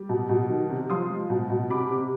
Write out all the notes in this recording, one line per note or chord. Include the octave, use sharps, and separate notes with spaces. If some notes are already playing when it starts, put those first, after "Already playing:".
Already playing: G3
B2
B2
D#3
C3
F3 C6 D#6
G#3
B2
B2
C3 B5 D6
C3